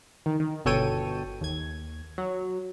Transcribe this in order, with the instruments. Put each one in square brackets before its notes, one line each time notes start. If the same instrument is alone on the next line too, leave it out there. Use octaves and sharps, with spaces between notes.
[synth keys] D#3
D#3
G1 B2 A4 C#5 G5 D#7
D#2 G#6
F#3